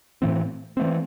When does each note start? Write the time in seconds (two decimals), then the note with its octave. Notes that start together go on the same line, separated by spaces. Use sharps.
0.22 A2 E3 C4
0.77 E3 A3 C4